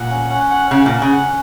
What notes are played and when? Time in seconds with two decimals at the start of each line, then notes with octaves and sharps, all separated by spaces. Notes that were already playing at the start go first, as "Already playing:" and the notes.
Already playing: A#2 F#5
0.09 C#4
0.30 C#4
0.50 F#5
0.70 C#3 C#4
0.86 A#2 C#4
1.02 C#3
1.12 F#5